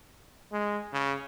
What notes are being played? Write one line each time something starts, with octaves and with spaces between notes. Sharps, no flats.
G#3
C#3